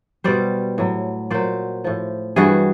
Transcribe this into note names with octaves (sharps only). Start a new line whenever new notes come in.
B2 G3 C5 D5
A2 F#3
A#2 F#3 C5 D5
A2 F3
G2 E3 G3 F#4 G#4